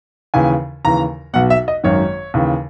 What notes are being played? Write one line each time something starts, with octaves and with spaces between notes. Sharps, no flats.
D#2 C#3 E3 G#5
D#2 C#3 E3 A#5
B1 B2 F#5
E5
D#5
G#1 F#2 D#3 C#5
D#2 C#3 E3